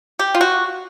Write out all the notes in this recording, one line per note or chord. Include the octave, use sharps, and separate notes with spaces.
G4
F4
F#4